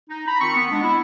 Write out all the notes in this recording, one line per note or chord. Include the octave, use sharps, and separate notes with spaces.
D#4
A#5 B5
D#3 C4 F4 B5 C#6
B3
G#3 B3 D4
E4